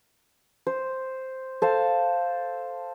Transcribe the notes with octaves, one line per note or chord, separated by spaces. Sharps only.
C5
A4 C5 F5